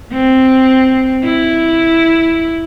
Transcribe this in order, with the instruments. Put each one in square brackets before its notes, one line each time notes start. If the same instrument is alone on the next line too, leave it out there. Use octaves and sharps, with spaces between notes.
[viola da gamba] C4
E4